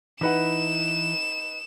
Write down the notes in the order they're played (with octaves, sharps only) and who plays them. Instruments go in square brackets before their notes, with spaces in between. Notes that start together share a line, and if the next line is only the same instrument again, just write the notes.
[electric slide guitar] E3 E4 [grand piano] D#4 B4 F#5 [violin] E7